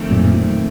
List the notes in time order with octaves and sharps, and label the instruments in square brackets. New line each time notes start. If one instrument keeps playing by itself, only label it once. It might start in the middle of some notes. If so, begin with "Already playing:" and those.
Already playing: [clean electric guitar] F2 D#3 A3 C4
[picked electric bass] F#2 A#2